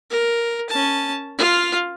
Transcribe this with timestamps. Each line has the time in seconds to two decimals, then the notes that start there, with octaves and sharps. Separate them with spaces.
0.10 A#4
0.69 C#4 A5
1.38 F4 F5